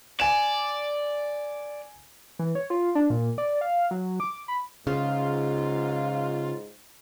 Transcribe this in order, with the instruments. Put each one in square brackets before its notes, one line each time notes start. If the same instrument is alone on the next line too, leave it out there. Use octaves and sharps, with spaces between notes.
[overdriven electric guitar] D5 [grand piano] G#5 E7
[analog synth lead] E3
C#5
F4
D4
A#2
D5
F5
F#3
D6
B5
[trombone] G#2 [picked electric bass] C#3 [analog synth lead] F4